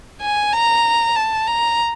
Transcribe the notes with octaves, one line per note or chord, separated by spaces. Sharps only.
G#5
A#5
A5
A#5